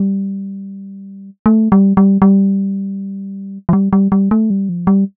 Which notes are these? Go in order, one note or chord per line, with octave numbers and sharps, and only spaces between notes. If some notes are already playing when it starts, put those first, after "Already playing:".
Already playing: G3
A3
G3
G3
G3
F3
G3
G3
G3
A3
G3
F3
G3